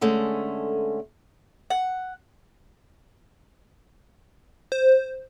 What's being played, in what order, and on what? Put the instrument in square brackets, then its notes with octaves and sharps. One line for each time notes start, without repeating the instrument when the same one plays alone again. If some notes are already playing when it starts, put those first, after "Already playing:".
[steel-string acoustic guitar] D3 G#3 A3 C#4
[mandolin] F#5
[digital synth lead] C5